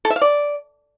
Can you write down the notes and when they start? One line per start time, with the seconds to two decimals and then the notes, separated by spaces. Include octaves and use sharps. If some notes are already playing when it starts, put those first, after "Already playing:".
0.05 A4
0.10 E5
0.16 F5
0.21 D5